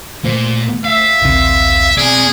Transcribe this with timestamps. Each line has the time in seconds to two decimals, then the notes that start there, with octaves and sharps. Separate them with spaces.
0.25 A#2 A3 C5
0.85 E5 F5
1.21 A#1 D#2 C3
1.97 B2 C4 G#4 D5 G#5